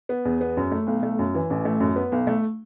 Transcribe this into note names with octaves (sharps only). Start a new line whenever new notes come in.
B3
E2
B3
F#2
A3
B1
A3
F#2
E3
A1
A3
F#2
B3
B1
A3